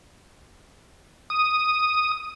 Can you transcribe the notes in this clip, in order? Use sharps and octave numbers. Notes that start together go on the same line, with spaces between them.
D#6